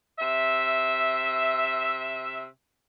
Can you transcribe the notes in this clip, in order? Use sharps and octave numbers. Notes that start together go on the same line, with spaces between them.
C3 E5